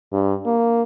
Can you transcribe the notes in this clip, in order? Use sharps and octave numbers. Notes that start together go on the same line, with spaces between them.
G2
A#3